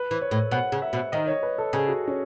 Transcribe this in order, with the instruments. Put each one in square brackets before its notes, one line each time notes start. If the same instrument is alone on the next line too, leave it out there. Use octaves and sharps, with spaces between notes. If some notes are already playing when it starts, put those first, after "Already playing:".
Already playing: [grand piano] B4
[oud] E3
[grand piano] C#5
[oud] A2
[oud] B2 [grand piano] F#5
[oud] C#3
[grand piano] E5
[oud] B2
[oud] D#3 [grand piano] D#5
[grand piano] C#5
B4
A4
[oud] C#3 [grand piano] G#4
[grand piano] F#4
C#4